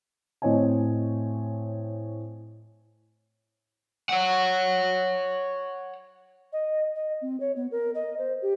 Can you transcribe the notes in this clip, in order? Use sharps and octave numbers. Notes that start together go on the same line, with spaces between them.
A2 C4 C#5 D#5 G#5
C#5 F#5
D#5
D#5
C4
C#5
B3
A#4
D#5
C5
G4